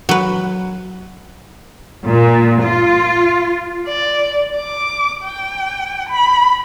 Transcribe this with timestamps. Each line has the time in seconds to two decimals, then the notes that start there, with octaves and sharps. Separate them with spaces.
0.09 F#3 B4
2.07 A#2
2.64 F4
3.88 D5
4.56 D6
5.24 G5
6.09 B5